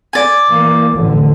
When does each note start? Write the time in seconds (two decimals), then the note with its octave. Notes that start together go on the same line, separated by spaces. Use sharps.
0.13 D5 G#5
0.49 E3 A#3
0.94 A1 F2 D3